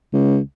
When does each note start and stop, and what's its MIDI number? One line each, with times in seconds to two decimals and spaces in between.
0.13 0.39 37